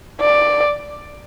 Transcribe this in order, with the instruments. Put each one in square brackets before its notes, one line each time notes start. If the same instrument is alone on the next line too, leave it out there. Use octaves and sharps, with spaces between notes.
[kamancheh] D5